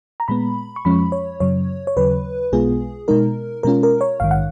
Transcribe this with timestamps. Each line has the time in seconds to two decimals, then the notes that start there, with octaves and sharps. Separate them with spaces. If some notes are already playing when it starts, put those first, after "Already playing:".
0.20 A#5
0.28 A#2 G#3 B3 B5
0.76 C#6
0.85 F2 F3 G#3 C#4 B5
1.12 C#5
1.40 F#2 C#3 F#3 C#5
1.87 C#5
1.97 D#2 C#3 F#3 B4
2.52 B1 B2 G#3 B3 F4 G#4
3.08 B2 G#3 D#4 A#4
3.63 B2 G#3 C#4 F4 A#4
3.83 A#4
4.01 C#5
4.20 A#1 G#2 D#3 F5
4.31 F#5